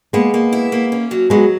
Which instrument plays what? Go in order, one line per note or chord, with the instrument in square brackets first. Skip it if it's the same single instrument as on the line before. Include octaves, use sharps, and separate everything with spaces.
[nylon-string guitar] G#3 B3 [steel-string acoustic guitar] A#3
[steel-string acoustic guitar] A#3
E4
A#3
C#4
F#3
[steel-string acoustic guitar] F#3 [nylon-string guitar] G#3 B3